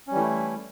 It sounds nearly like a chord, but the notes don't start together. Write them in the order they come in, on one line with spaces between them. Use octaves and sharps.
C#4 G3 E3 A3 E4